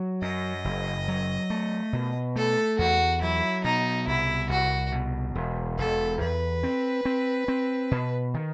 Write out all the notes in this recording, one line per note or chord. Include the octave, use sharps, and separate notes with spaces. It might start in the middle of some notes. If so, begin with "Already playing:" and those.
Already playing: F#3
F#2 D#5
F#1
F#3
A3
B2
A3 A4
E2 F#4
F#3 E4
B2 D#4
C2 E4
C2 F#4
B2
E1
E1 A4
E2 B4
C4
C4
C4
B2
D#3